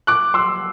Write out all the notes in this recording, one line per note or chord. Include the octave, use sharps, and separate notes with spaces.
D6 F#6
C6 E6